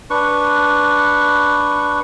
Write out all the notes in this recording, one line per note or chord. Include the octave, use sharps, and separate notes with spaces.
D4 B4 C#6